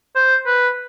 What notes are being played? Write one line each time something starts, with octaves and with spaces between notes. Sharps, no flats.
C5
B4